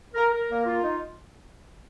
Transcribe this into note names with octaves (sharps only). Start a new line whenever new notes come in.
A#4
A#4
A#3
F4
D#4